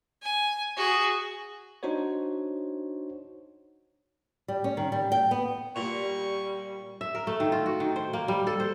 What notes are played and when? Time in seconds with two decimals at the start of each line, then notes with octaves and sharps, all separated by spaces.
0.23 G#5
0.77 F#4 G#4
1.83 D4 D#4 F#4 C5 C#5
4.48 G3
4.64 C#4
4.77 D#3
4.92 G3
5.12 G5
5.31 B3
5.76 A#2 G3 C#6
7.01 E5
7.15 A#4
7.27 A3
7.40 D#3
7.52 F4
7.66 F#4
7.80 D#3
7.96 C5
8.13 A#3
8.28 G3
8.47 A4
8.60 C5